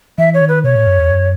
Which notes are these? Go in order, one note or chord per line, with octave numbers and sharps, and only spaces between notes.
E3 E5
C#5
D#3
B4
B2 C#5
A2
F#2
E2
F#2